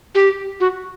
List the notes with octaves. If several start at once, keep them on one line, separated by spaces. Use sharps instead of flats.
G4
F#4